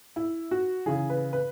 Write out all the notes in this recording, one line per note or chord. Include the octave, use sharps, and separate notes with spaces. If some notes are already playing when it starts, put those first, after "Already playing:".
E4
F#4
C#3 E3 G#4
B4
B4